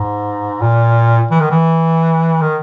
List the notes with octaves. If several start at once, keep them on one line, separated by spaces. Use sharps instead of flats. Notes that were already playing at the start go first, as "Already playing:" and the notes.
Already playing: G#2
A#2
E3
D#3
E3
D#3